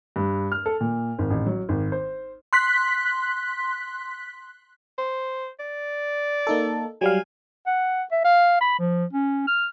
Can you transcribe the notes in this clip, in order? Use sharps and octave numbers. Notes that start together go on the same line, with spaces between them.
G2
F6
A4
A#2
G#1
A1
F#3
G#1
C5
C6 F#6 B6
C5
D5
A#3 D#4 A4
F#3 G3 F5 G#5
F#5
E5
F5
B5
F3
C#4
F6